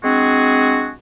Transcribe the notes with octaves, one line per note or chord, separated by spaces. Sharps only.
G#3 C4 D4 F#4 G#4